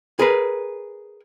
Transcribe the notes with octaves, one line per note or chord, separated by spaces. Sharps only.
G#4 A#4 B4